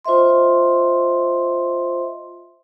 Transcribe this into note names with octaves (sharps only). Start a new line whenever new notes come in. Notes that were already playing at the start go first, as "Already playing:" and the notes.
F4 C5 D#5 E5 C6